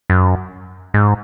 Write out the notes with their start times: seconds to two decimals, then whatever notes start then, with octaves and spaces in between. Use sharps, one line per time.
0.10 F#2
0.94 G#2